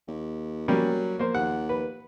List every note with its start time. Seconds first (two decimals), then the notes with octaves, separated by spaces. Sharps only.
0.08 D#2
0.68 F#3 G3 A#3 C#4
1.19 A#3 C5
1.35 D#2 F#5
1.69 B4